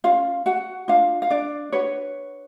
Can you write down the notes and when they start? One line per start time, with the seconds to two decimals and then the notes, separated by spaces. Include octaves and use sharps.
0.04 C#4 F4 F5
0.46 F#4 F#5
0.88 D4 F4 F5
1.22 F5
1.30 D4 D5
1.72 D4 F#4 B4 C#5